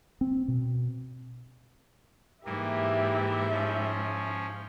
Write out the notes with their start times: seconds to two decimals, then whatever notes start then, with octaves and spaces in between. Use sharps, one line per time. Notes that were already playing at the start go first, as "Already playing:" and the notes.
0.21 C4
0.48 B2
2.45 G#2 E3 A#3 E4 G4 E5
3.51 F3 C#4